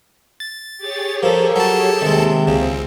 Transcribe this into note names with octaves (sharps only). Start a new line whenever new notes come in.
A6
G4 G#4 C#5
F3 A4 A#4
F#3 A4 A5
D#2 C3 D#3 G#3
C#2 C#3 C4